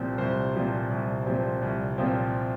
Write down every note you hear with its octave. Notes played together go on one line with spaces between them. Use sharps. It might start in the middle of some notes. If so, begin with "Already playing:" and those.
Already playing: C2 A#2 F3 C4
C2 C5
A#2 F3 C4
C2
A#2 F3 C4
C2
A#2 F3 C4